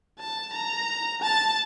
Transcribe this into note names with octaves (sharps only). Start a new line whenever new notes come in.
A5
A#5
A5